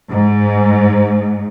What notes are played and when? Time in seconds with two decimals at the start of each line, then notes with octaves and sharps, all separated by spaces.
0.11 G#2